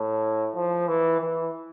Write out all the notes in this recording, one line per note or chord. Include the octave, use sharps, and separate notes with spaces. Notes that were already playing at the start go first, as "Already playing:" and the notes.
Already playing: A2
F3
E3
E3